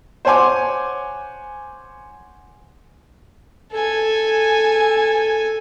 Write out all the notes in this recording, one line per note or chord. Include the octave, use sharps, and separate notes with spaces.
C5 C#5 F#5 G#5 C6 D6
A4 G#5